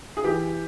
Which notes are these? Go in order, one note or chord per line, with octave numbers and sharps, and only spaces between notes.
G#4
E3 G4